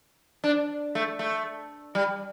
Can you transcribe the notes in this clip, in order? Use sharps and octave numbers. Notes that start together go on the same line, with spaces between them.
D4
A3
A3
G3